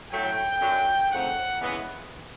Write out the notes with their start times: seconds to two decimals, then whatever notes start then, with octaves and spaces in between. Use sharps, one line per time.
0.12 A2 F#3 A3 G5
0.61 F#2 D3 F#3
1.11 C#3 F3 A3 C4 D#4 F#5
1.60 C#3 E3 G#3 B3